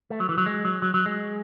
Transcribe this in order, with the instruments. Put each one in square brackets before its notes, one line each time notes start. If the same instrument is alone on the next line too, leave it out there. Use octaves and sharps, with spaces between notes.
[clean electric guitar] A3
F#3
E3
F#3
G#3
F#3
F#3
F#3
G#3